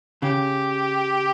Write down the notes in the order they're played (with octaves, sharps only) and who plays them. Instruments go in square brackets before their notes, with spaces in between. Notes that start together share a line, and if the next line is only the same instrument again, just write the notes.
[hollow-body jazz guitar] C#3 [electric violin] G4